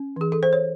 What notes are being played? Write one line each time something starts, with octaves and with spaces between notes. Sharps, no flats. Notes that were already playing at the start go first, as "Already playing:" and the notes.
Already playing: C#4
E3 G#4
A4
C5
C#5